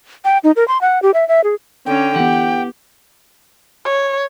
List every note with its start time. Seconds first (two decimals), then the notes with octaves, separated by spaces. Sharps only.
0.25 G5
0.44 D#4
0.56 A#4
0.68 C6
0.81 F#5
1.03 G4
1.14 E5
1.28 E5
1.44 G#4
1.86 D3 C#4 G5
2.16 E3 B3 G4 F#5
3.85 C#5